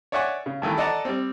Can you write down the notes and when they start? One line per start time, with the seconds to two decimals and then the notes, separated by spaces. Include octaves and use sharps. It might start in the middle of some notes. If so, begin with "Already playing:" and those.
0.12 C#5 D5 E5 F#5 G#5 C#6
0.46 C#3
0.62 G2 D#3 E3 A3
0.77 A4 D5 D#5 F#5 A5 A#5
1.05 G3 C4